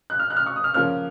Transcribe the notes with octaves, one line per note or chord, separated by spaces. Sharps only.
F#6
F6
F#6
F6
C#6
D#6
F6
C#3 F3 A#3 C#4 F6